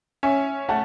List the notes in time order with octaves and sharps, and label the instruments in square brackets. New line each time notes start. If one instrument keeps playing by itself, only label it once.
[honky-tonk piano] C#4 [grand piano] E5 G#5
[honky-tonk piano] A3 [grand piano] F#5 A5